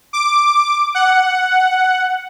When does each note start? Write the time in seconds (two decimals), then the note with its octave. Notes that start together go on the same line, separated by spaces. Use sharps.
0.13 D6
0.95 F#5